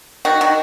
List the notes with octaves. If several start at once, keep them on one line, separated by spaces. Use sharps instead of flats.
D#3 F#4
D#3 F#4